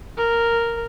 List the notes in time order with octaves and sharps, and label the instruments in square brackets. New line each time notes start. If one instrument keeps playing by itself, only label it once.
[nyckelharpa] A#4